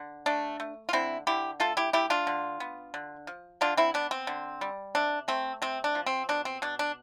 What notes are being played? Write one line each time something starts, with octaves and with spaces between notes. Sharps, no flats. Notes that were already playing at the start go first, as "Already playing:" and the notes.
Already playing: D3
A3 D4
A3
F4
D3 C4 E4
D3 E4 G4
A3 F4 A4
E4 G4
A3 E4 G4
D4 F4
D3
B3
D3
F3
D3 D4 F4
C4 E4
B3 D4
C4
D3
G3
C3 D4
A3 C4
C3 C4
D4
F3
C4
B2 D4
C4
B2 D4
D4